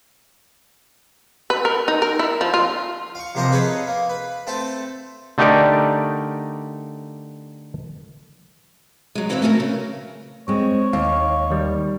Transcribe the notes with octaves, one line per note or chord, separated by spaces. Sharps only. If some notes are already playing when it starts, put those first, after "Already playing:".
B4
A#4
D#4
A#4
E4
F3
F4
F5 C#6
C3 F3 A#3 A#4 C5 D#5
G#4 A4 B4 C#5 D#5
A#3
B4
A3 C4 A4 A5
D3 A3 D#4 G4 A#4 D5
F#3 G#3
B2 E3 C4 E4 B4 F5
A3 B3 C#4 E4 F#4 A#4
C#3
G#3 C4 C#5
D#2 F5
D#3 G3